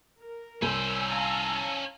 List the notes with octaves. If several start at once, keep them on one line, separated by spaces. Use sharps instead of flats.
A#4
C2 C#4 C5 G#5 E6
F5 A5 A#5